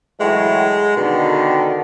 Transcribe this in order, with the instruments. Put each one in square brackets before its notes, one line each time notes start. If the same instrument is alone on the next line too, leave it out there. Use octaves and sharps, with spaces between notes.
[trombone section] A2 E3 F#3 [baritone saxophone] G#3
[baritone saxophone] B2 [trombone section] D3 D#3